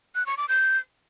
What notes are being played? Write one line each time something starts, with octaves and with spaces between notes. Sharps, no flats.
F#6
C#6
D6
G6